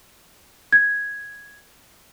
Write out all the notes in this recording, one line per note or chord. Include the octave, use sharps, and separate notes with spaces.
G#6